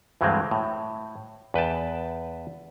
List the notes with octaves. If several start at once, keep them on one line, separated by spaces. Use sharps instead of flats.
D2 G2 E3 F#3 G#3 C4
A2
E2 B4 G5 A5